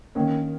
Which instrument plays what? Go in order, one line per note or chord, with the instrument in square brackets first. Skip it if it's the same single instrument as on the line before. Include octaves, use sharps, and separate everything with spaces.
[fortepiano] D#3 A#3 C#4